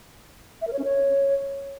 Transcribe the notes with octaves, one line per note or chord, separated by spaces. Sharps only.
E5
A#4
C#5
C#4
C#5